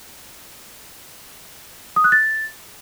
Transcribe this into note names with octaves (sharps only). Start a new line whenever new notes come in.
D#6
F#6
A6